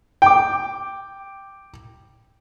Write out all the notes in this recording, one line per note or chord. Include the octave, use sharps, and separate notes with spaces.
G5 D6